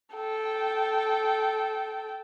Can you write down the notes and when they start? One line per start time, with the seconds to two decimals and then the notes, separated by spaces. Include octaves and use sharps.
0.14 A4 G5